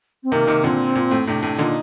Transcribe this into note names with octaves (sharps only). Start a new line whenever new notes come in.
C4
C3 D#3 A#3
C3 D#3
A#2 D3 C4
A#2
A2
A2 C3 D4
A2 C3
A#2 D3 D#4